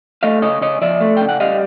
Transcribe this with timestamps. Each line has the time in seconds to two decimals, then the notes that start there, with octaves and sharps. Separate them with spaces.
0.23 A3 D#5 F5
0.42 C#3 C#5 D#5
0.61 C#3 C#5 D#5
0.81 F3 D5 E5
1.01 A3
1.17 C#3 G5
1.29 F#5
1.40 G3 D#5 F5